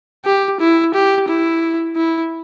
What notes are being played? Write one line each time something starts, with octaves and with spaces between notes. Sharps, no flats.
G4
E4
G4
E4
E4